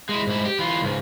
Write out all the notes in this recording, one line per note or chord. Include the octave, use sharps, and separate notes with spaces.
G#3 E4
G#2 E4
G4
E3 F4
C#2 G#2